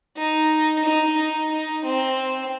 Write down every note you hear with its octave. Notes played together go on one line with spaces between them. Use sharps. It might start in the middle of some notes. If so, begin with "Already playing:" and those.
D#4
D#4
D#4
D#4
C4